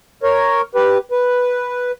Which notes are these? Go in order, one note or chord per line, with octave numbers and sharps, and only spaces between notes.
A#4 C#5
G4 B4
B4